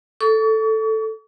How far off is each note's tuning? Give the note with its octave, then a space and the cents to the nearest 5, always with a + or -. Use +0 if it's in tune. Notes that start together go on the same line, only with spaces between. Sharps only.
A4 +0 C#6 +40